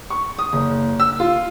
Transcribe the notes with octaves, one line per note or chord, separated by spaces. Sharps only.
C#6
D#6
F#1
E6
F4